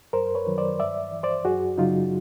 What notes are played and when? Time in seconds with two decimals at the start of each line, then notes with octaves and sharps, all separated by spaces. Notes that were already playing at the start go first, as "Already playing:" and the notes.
0.13 F#2 A#4 C5
0.35 B4 C#5
0.47 D#3 F#3
0.58 C5 D5
0.80 G2 D5 E5
1.12 E3
1.23 C5 D5
1.45 F#2 F#4 G#4
1.78 C#3 F#3 D#4 F4